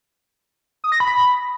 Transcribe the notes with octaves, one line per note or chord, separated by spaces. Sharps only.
D#6
A#6
B5